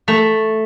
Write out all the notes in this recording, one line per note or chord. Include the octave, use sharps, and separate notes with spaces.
A3